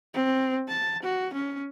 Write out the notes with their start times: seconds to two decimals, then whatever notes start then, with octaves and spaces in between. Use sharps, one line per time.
0.14 C4
0.68 A5
1.03 F#4
1.33 C#4